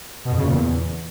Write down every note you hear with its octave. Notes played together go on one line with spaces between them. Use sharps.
B2
F2
C#3
A#2
E2